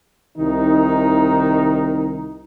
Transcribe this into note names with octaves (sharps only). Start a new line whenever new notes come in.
C2 D#3 D#4